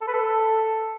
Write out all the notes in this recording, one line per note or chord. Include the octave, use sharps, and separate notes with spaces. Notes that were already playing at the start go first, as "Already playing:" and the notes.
A4
B4
A4